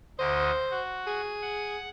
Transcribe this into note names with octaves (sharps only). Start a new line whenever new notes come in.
D2 D3 C5 D#5
F#4
G#4
F#5